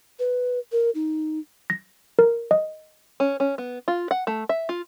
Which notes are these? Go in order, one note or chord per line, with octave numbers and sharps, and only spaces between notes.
B4
A#4
D#4
A#6
A#4
D#5
C#4
C#4
B3
F4
F#5
A3
E5
F4